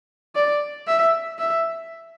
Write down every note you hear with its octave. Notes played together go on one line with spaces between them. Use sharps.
D5
E5
E5